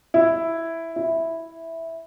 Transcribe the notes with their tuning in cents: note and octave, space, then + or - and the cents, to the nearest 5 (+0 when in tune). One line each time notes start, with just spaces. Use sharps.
E4 +0
E4 -5